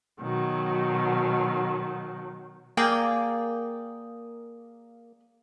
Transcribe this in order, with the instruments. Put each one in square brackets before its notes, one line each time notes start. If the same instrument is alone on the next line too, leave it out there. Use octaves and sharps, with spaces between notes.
[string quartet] B2 D#3 F#3
[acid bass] A#3 [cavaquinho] G#4 D5 G5